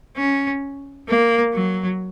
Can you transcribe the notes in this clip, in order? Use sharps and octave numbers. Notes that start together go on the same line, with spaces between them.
C#4
A#3
F#3